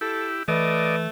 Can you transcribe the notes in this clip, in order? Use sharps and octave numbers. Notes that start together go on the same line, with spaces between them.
E4 G4 A4
E3 A3 B4 D5 D#5